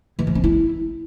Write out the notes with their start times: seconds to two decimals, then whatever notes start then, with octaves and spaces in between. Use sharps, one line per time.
0.19 E3
0.27 F3
0.35 C#4
0.44 E4